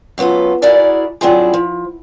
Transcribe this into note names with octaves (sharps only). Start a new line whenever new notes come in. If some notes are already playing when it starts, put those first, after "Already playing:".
F#2 F#3 B3 F4 A4
E4 F#4 G#4 A#4 D5 E5
F#3 C4 D4 E4 F4 G#4
F3